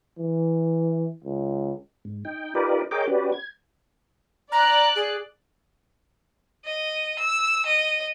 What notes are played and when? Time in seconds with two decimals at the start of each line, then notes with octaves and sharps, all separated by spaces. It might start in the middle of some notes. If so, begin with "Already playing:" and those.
0.19 E3
1.24 C#2
2.05 G#2
2.25 D#4 G5
2.55 D#4 F4 G4 A#4 B4 D5
2.91 G#4 A#4 C#5 D#5 G5 D6
3.07 C#4 F#4 G4 B4 D5
3.32 G#6
4.52 D5 A#5 F#6
4.96 G#4
6.65 D#5
7.19 E6
7.66 D#5